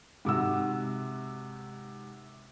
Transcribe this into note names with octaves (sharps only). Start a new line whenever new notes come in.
G#2 C3 F#4 E6